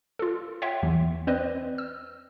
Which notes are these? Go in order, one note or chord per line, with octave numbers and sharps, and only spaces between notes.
F4 A4
C#5 E5 F#5 G5 C6
E2 E3
C4 B4 C5 D5 D#5
E6